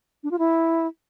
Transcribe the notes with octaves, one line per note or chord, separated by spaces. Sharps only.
D4
F4
E4